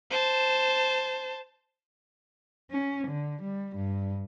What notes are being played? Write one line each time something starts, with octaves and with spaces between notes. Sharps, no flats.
C5 A5
C#4
D3
G3
G2